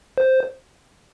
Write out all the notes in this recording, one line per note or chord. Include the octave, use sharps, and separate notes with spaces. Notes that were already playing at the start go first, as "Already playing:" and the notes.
C5